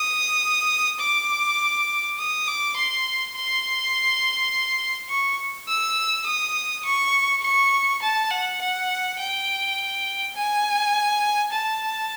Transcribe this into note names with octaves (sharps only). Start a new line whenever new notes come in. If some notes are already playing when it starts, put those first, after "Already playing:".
Already playing: D#6
D6
D#6
D6
C6
C6
C#6
E6
D#6
C#6
C#6
A5
F#5
F#5
G5
G#5
A5